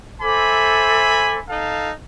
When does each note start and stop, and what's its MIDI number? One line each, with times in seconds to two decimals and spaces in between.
0.21 1.38 69
0.21 1.38 72
0.21 1.43 76
0.21 1.43 80
0.21 1.43 83
0.21 1.38 86
1.50 1.91 63
1.50 1.91 69
1.50 1.91 77